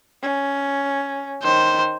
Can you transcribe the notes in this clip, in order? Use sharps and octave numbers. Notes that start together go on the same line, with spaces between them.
C#4
D#3 C5